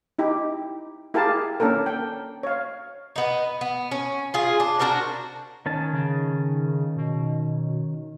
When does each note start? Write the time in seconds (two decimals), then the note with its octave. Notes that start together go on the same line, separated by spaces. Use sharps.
0.19 D#4 E4 G4
1.14 E4 G4 G#4 A#4 F5 A5
1.60 A#3 C#4 D4 A4 A#4
1.86 G5
2.43 C#5 F5
3.16 B3 D#4
3.61 B3
3.91 C#4
4.34 F4 G#4
4.60 D4
4.79 D4 F#4 A#4 C5
5.66 D#3 C#4 A5
5.93 C#3
6.97 B2